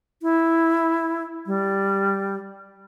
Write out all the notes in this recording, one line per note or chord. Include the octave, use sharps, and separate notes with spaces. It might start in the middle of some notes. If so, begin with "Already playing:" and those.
E4
G3